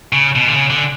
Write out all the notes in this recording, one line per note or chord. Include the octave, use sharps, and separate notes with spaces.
C#3
B2
D3
C#3
D3